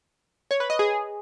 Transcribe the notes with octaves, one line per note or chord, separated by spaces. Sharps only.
C#5
B4
D#5
G#4